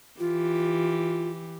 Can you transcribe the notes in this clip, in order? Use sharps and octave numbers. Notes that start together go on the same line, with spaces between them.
E3 F4 G4